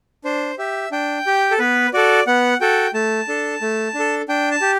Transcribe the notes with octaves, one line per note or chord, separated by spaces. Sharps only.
D4 C5
G4 E5
D4 G5
G4
A4
B3 B4
F#4 A4 D5
B3 F#5
F#4 A4 G5
A3 A5
D4 A4
A3
D4
A4
D4 G5
A5
G4